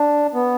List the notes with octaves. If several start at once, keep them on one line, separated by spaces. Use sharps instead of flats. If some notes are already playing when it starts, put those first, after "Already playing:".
Already playing: D4
B3